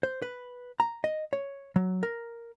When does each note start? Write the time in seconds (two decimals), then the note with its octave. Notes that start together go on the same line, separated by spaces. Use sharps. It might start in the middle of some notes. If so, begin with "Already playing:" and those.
0.03 C5
0.22 B4
0.80 A#5
1.04 D#5
1.33 C#5
1.76 F#3
2.03 A#4